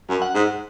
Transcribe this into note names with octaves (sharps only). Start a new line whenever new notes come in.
F#2
F#5
G#2